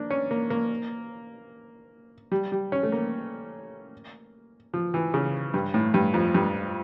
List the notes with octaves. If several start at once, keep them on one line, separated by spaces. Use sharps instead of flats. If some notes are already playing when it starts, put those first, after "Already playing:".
Already playing: A#3 D4
C#4
A#3
A#3
G3
G3
C#4
A3
A#3
F3
E3
C#3
G2
A2
G2
F2
G2